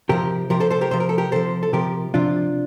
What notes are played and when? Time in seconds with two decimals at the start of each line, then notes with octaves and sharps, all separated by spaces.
0.09 C3 F3 G4 A#4
0.50 C3 F3 G4 A#4
0.60 A4 C5
0.71 A4 C5
0.81 G4 A#4
0.91 C3 F3 C5
1.00 A#4
1.09 A4
1.18 G4 A#4
1.32 C3 F3 A4 C5
1.63 A4
1.73 C3 F3 G4 A#4
2.14 C3 F3 D4 F4